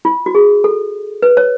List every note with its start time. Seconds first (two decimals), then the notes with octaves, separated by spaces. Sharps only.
0.05 F4
0.26 F#4
0.35 G#4
0.64 A4
1.22 B4
1.37 C#5